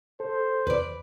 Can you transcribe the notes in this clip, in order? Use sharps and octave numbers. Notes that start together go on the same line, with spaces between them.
A4 C5
E2 B4 D5